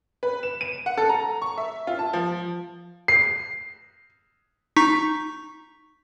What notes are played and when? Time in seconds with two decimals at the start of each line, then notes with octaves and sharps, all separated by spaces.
0.23 B4
0.43 E7
0.61 D#7
0.86 F#5
0.98 A4
1.09 A#5
1.42 C#6
1.58 E5
1.87 F4
1.99 A5
2.13 F3
3.08 C7
4.76 D#4 C#6 B6